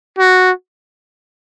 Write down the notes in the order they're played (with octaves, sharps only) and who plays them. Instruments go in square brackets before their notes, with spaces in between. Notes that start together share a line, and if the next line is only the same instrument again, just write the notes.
[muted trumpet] F#4